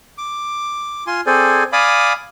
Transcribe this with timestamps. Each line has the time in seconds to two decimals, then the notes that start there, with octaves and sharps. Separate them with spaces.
0.18 D6
1.07 F4 G#5 C6
1.27 C4 G#4 A4 C5 D5 G#5
1.73 D5 F5 G#5 B5 D6 D#6